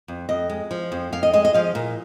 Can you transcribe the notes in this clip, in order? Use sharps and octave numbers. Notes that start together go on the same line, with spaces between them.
F2
F2 D#5
G#3
F3
F2
F2 F5
D#5
G#3 D#5
D#5
F3 F5
A#2